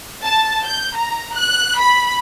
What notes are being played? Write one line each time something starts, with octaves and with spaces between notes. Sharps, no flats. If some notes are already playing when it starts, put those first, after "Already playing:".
A5
G6
A#5
F#6
B5